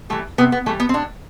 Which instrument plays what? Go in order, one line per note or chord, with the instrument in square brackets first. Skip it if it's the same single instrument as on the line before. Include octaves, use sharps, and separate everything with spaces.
[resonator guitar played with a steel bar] E3 G3 A3
C3 B3
B3
E3 A3
G3
B3
C4
A2 D4